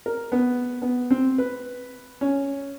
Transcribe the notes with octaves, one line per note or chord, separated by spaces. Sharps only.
A#4
B3
B3
C4
B4
C#4